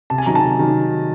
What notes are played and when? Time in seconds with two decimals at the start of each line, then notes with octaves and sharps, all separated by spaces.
0.10 C3 A5
0.18 G#5
0.26 D#3 F#3 A#5
0.35 A5
0.42 C3
0.59 D#3 F#3